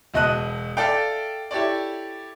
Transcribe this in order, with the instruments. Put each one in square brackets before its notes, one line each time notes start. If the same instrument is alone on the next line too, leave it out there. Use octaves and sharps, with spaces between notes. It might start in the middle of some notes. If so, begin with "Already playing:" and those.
[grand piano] E1 B2 D#5 A5 F#6 D#7
A4 D5 E5 F5 G5
E4 G4 A4 C#5 D5